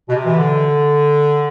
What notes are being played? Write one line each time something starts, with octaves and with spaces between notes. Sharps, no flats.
B2
C3
E3
D3